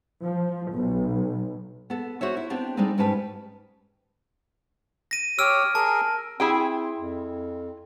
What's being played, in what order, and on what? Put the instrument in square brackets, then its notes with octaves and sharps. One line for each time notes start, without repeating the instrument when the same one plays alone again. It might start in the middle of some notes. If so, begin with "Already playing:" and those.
[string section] F3
B1
[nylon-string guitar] B3 A4
F#4 C5 C#5 E5
E4
B3 C4 D4 G4
G3 G#3 C4 D4 D#4 A4
G#2 G3 C#4 G4 B4 A5
[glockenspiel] A#6 D#7
[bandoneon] G4 C#5 [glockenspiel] E6 F6 D7
[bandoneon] G#4 A#4 [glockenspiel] A5
[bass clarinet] C4 [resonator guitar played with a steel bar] E4 G#4 G5
[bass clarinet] F2